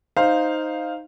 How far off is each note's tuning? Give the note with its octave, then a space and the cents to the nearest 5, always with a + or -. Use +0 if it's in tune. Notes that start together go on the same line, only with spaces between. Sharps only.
D#4 +0 C5 +0 F5 +0